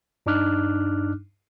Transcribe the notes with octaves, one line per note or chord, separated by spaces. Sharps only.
G2 D4 D#4 D6 F6 F#6